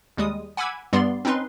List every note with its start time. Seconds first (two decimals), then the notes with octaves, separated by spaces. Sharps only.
0.17 D#2 G3 G#3 D#6
0.57 F#5 G#5 B5 D6 E6 G#6
0.93 G2 G3 B3 D5 C6
1.25 C4 C#4 D#4 B4 C6